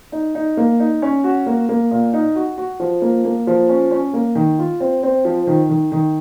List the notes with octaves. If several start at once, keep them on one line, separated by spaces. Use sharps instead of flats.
D#4
D#4
A#3
D#4
C#4
F#4
A#3
A#3
A#2
D#4
F#4
F#4
F3
A#3
A#3
F3
C#4
C#4
A#3
D#3
F4
C4
C4
F3
D#3
D#3
D#3